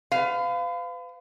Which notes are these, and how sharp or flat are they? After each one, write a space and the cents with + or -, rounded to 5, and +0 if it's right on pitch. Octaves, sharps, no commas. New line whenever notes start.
B4 +40 F5 +0